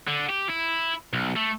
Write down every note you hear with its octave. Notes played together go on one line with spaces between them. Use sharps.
D3
G4
E4
B1
A3